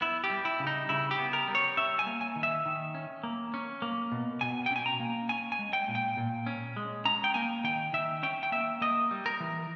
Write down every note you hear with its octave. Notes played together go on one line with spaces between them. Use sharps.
B3 E4
G4
G3
E4
C#3
D#4
C#3 E4
G4
B3
A#4
G3
C#5
C#4 E5
G#5
A#3
G#5
D#3
E5
D#3
C#4
A#3
C#4
A#3
B2
B2 G#5
G5
C#4 G#5
A#5
A#3
C#4 G#5
G#5
G#3
G5
A#2
G5
A#2
C#4
G#3
C#4 A#5
G5
A#3 G#5
D#3 G5
D#3 E5
C#4 G5
G5
A#3 E5
A#3 D#5
G3
A#4
E3